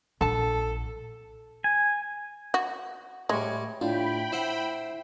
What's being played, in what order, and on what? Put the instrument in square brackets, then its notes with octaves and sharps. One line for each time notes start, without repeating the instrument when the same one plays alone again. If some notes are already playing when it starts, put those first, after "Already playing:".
[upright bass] A#1 [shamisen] D3 A5 [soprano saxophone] A4
[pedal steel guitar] G#5
[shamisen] F#4
[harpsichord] A2 G3 [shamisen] G#3 [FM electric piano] C#6 G#6
[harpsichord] A2 [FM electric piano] D4 E4 F4 [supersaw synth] G5 B5
[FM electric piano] E4 [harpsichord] C5 E5 F#5